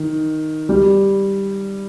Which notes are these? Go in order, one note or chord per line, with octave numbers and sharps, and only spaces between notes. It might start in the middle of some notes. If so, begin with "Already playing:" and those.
Already playing: D#3
G3